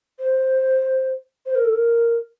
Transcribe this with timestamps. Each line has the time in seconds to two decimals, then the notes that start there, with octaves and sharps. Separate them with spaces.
0.19 C5
1.46 C5
1.55 A#4
1.65 A4
1.73 A#4